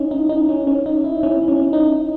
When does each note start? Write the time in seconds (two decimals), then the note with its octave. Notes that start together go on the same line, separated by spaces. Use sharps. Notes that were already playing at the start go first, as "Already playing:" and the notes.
Already playing: C#4 D#4 E4
0.11 D#4
0.29 D#4
0.49 C#4
0.67 C#4
0.86 D#4
1.04 E4
1.23 C#4
1.48 C#4
1.73 D#4